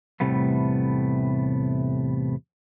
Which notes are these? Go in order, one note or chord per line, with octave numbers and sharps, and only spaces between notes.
E2 A2 C3 G3 A3 B3